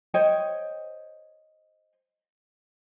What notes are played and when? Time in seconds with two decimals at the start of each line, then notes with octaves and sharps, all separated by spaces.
0.14 C5 C#5 D#5 G5